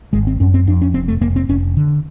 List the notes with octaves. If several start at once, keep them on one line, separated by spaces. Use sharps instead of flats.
G#1 G#3
C4
F#2 C#4
C4
F2 D4
C#4
F1 C4
A3
F1 A#3
C4
F1 C#4
D3